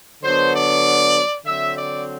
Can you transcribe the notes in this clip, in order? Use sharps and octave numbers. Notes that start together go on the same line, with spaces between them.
D3 F#3 B3 D4 C5
D5
D3 F#3 C4 E5
D5